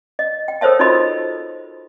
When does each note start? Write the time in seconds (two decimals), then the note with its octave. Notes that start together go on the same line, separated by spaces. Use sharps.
0.19 D#5
0.48 G5
0.61 A4 A#4 C5 C#5 E5 A5
0.79 D#4 F4 F#4 A4 D#5 B5